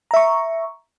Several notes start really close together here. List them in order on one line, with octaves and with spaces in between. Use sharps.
A#5 E5 C#6